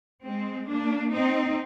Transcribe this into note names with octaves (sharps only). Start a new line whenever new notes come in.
G#3 C4
A#3 D4
C4 D#4